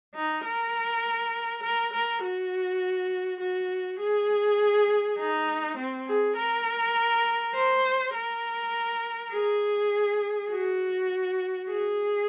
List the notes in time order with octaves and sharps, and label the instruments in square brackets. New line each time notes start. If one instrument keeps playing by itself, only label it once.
[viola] D#4
A#4
A#4
A#4
F#4
F#4
G#4
D#4
C4
G#4
A#4
C5
A#4
G#4
F#4
G#4